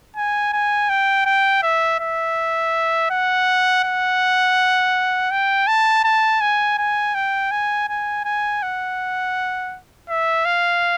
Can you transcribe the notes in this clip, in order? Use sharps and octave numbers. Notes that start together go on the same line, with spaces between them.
G#5
G#5
G5
G5
E5
E5
F#5
F#5
G5
A5
A5
G#5
G#5
G5
G#5
G#5
G#5
F#5
E5
F5